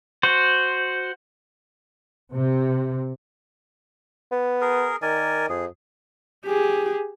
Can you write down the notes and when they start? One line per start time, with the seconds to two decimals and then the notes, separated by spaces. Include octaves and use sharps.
0.23 F#4 C5
2.32 C3
4.32 B3
4.61 G#4 A#4
5.02 D#3 A#4 D5 G#5
5.49 F2 G#4
6.46 G4 G#4